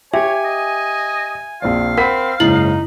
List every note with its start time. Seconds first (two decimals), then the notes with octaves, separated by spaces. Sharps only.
0.13 G4 C#5 E5 G#5
0.44 D#5
1.62 A#1 C4 D5 F5
1.97 C4 A#4 F#5 B5 B6
2.40 F#1 G#2 C#3 D#4 E4 F#7